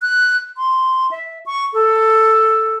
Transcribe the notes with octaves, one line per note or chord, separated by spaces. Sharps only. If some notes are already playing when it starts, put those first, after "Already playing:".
F#6
C6
E5
C#6
A4